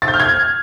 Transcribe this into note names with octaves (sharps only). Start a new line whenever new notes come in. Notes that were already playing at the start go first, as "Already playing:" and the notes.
A6
G6
F6
G#6